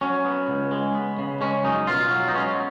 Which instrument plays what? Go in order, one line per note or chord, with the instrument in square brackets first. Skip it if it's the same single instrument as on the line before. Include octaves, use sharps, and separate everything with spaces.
[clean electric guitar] F#3 C#4
B3
C#2
G#3
B3
C#3
G#3 C#4
F#2 D#4
B2 F4
F#3
D#4
G#3 C#4